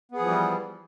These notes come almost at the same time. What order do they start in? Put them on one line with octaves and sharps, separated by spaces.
B3 G#4 F3 E3 G3